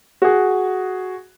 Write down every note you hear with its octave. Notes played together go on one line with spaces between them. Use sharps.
F#4 G#4